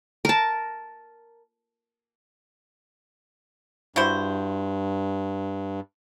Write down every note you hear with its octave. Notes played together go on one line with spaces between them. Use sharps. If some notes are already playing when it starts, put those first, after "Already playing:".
A#4 A5
G2 E4 F#4 C5